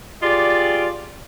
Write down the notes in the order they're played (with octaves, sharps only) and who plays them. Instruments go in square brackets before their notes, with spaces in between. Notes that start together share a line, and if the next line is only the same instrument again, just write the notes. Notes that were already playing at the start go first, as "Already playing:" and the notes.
[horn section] F4 G4 G#4 D5